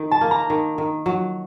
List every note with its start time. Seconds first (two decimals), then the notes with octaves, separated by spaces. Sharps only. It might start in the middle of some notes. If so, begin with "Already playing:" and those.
Already playing: D#3
0.11 A5
0.21 A#3
0.31 A#5
0.50 D#3
0.78 D#3
1.06 F#3